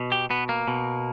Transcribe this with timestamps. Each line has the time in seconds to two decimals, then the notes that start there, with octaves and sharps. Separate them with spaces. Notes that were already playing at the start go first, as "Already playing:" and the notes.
Already playing: B2
0.12 G4
0.30 B2 B3
0.49 A#3
0.68 B2